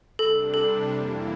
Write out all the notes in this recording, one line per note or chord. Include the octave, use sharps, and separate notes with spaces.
C3 G3 D4 A4
A4
F2 E3 A#3 E4